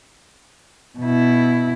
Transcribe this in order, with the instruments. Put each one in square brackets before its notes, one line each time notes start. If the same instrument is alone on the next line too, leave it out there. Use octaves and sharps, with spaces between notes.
[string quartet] B2 E4